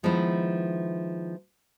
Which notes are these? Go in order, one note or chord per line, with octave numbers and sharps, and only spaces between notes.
D#3 F3 G#3 B3 D#4 E4